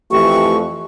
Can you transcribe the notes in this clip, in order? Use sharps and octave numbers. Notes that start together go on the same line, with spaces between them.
F2 E3 A3 G4 C#6